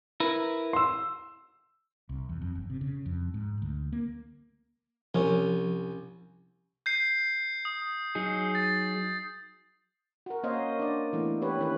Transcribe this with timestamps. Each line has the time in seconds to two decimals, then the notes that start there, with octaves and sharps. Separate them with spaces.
0.20 E4 A#4 B4
0.73 C6 E6
2.09 C2
2.29 E2
2.42 F2
2.55 G1
2.70 C3
2.81 C#3
3.06 F2
3.34 G#2
3.62 D2
3.92 A#3
5.15 C2 F3 C#4
6.86 G6 C7
7.65 D#6
8.15 F#3 D#4 G#4
8.55 A6
10.26 F#4 A#4
10.43 A#3 C#4 C5 C#5 D#5 F5
10.80 D4 D5
11.13 E3 A3 B3
11.41 E4 G4 B4 C#5
11.59 D#3 C#4 B4